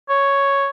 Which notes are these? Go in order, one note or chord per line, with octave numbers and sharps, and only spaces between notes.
C#5